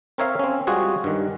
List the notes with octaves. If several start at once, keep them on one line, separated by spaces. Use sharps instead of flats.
C4 A#4 C#5 E5 F5
C4 C#4
G3 G#3 F4 F#4 G#4
G2 D#3